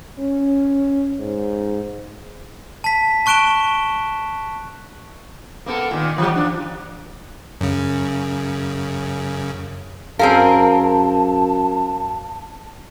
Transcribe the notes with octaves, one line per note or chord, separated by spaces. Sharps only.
C#4
G#2
A5 B6
A5 C#6 F#6 D7 E7 G7
A#3 B3 A4
A#2 D#3
E3 F#3 G4
F3 D4
F#2 C#3
F#2 C4 G#4 A#4 F5 A5